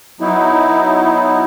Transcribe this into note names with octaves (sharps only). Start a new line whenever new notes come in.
F#3 B3 D#4 E4